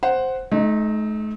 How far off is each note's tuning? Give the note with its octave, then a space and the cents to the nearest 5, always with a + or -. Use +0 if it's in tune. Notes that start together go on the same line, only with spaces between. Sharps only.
C5 +0 F#5 +5
A3 -40 D#4 +0